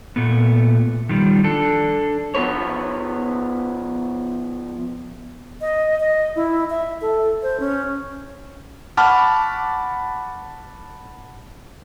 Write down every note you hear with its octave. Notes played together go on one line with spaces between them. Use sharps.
A#2 A3 B3
D#3 F3 G3
D4 A4
F3 B3 B4 C#5
D#5
D#5
E4
E5
A4
C5
C#4
F#5 A5 B5 C#6 D6 F6